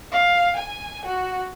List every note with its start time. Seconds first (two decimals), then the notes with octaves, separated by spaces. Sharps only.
0.12 F5
0.57 G#5
1.06 F#4